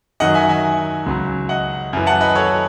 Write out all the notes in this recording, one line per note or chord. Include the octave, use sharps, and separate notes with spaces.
F#2 D#3 F#3 D#5 F#5
E5 G#5
E5 G#5
C#2 C#3 F#3
D#5 F#5
F#2 E3
F#5 A5
B4 D#5
A4 C#5